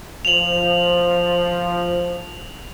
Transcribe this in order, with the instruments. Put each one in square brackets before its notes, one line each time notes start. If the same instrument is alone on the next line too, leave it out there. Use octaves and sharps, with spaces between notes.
[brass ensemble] F3 [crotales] F7 F#7